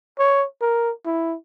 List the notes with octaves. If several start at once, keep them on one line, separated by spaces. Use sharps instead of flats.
C#5
A#4
E4